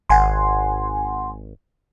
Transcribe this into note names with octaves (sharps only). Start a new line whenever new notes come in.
G#1 F#5 G#5 C6